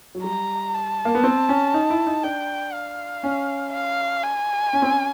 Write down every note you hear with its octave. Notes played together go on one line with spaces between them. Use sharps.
F#3
G3 A#5
A5
A#3
B3
C4
C#4
D#4
E4
D#4
D4 G5
F5
C#4
F5
G#5
C#4
C4
C#4